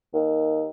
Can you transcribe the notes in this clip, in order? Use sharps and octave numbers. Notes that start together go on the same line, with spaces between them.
D#2